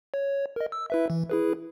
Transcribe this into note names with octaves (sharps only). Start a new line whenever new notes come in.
C#5
A#4 D#5
E6
E4 B4 E5
E3
E4 G#4 B4